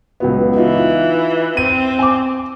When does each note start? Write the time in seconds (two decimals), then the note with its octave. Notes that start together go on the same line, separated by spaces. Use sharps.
0.20 C#2 F#3 B3
0.57 E3 D#4 F4
1.57 C4 D#7
1.99 G#5 D6